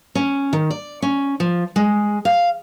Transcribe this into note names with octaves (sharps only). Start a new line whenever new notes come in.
C#4
D#3
D5
C#4
F3
G#3
F5